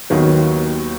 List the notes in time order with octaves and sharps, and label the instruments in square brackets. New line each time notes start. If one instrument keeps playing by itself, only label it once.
[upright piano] D#2 D#3 F#3 B3